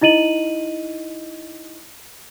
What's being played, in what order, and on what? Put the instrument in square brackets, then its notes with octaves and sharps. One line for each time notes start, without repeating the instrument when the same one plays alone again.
[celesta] D#4 E4 D#5 D#7 F#7